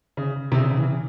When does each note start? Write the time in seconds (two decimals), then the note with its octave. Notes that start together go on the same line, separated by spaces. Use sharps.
0.17 C#3
0.52 C3
0.57 C#3
0.70 C#3
0.77 E3